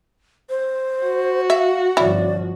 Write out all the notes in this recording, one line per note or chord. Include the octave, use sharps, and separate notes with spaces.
C5
F#4
E5 F5
G1 F3 C#4 E4 D5